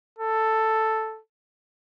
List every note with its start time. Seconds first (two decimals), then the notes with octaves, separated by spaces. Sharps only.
0.19 A4